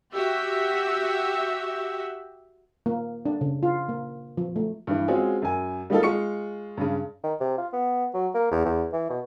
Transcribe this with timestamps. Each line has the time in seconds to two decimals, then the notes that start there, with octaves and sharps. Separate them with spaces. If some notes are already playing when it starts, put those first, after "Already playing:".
0.12 F#4 G4 E5
2.86 A#3
3.26 D4
3.41 C#3
3.63 F4
3.89 A#3
4.37 F3
4.56 A3
4.87 G2 E3
5.08 G#3 C4 C#4 F4 F#4 G#4
5.42 F#2 G#5
5.90 G3 A#3 D#4 F4 A4
6.03 G#3 F4 C#6 C#7
6.77 G2 C#3
7.23 D#3
7.40 C3
7.58 F4
7.73 B3
8.14 F#3
8.34 A#3
8.51 E2
8.65 E2
8.93 E3
9.09 B2